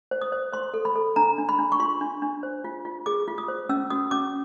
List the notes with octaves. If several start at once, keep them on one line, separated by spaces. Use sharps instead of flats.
C5
D#6
C5
C5 C6
A4
B5
A4
D4 A#5
D4
B5
D4
C#6
F4 C6
D4
D4
C5
F4
F4
G#4 D6
F4
D#6
C5
C#4 E6
F#4 D#6
C#4 D6